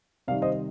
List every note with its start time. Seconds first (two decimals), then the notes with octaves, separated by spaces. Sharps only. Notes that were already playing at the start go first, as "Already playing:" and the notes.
0.28 C3 D#3 G3 D5 F5
0.42 C5 D#5